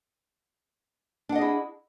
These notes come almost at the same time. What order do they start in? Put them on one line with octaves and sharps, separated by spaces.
D4 F#5 D#5 G#4 E4